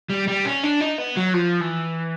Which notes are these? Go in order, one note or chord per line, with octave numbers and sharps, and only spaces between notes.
G3
G3
C#4
D4
D#4
B3
F#3
F3
E3